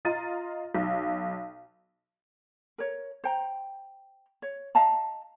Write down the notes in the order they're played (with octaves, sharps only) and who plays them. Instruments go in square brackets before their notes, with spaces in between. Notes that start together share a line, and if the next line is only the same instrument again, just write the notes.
[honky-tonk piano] F4 D#5 F5 A#5 A6 D#7
B1
[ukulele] A#4 C#5
C5 G5 A#5
C#5
D#5 F5 A5 A#5